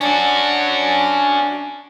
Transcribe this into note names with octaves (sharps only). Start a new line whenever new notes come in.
C#4 D4 F#4